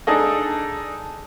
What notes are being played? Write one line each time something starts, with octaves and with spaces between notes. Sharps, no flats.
D4 D#4 G#4 A4 D#5